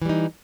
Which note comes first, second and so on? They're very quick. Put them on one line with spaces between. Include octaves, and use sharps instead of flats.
E3 G3 D#4